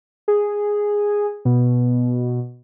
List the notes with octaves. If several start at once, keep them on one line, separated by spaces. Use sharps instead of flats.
G#4
B2